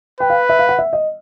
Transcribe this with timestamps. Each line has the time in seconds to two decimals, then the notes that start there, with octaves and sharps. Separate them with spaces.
0.20 B4 G5
0.30 F5
0.49 E5
0.59 F5
0.69 F#5
0.79 E5
0.93 D#5